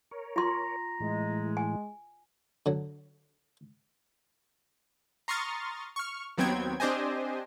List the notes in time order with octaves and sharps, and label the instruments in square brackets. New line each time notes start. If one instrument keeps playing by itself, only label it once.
[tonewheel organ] A#4 C#5
[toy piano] F4 C6 [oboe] A#5
[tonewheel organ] A2 E3 [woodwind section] G#3
[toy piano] G#5
[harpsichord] D3 F#3
[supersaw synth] A#5 C6 C#6 D#6 F6 A6
C#6 F6
D#2 F#3 B3 C4 G5 G#6
C4 D4 G4 C5 D#5 G#5